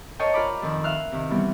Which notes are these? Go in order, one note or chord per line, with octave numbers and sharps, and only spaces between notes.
A#4 C5 C#5 D#5 G5 A5
F4 A#4 D5 A#5 B5 D6
F2 D#3
E5 F5 F6 F#6
C3 D#3
E3 G3 B3 C4